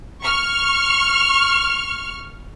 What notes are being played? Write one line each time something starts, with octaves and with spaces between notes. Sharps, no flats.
C#6 F6